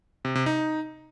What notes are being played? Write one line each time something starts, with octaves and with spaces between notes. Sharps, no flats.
C3
C3
D#4